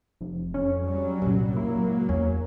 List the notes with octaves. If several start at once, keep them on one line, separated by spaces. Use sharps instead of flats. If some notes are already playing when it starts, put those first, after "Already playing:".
F1
F2 C#4
F#3 G3
C2 G2 A#2
G#2 C#3 F#3 A#3 E4
E2 C#4